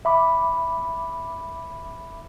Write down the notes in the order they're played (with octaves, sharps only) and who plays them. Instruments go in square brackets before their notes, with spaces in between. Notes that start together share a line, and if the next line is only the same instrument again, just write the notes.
[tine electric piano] E5 B5 D6